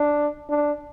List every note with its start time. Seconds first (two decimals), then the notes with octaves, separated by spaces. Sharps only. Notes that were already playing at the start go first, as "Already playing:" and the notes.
Already playing: D4
0.49 D4